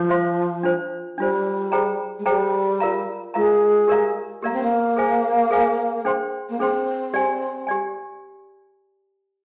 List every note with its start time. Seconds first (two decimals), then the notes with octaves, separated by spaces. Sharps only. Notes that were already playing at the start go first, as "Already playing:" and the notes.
Already playing: F3
0.09 C5 F5 C6
0.63 D4 F4 C5
1.18 G3 D4 F4 C5
1.72 G#4 C5 G5 A#5
2.18 G#3
2.26 G3 G#4 C5 G5 A#5
2.80 F4 A#4 F5 A#5
3.34 G#3 F4 A#4 F5 A#5
3.88 G4 A#4 D5 F5 A#5
4.42 A#3 G4 A#4 D5 F5 A#5
4.53 C4
4.62 A#3
4.96 G#4 C5 F5 G#5
5.51 G#4 C5 F5 G#5
6.05 D4 G#4 C5 G5 C6
6.49 A#3
6.59 C4 D4 G#4 C5 G5 C6
7.14 G4 D5 G#5
7.67 G4 D5 G#5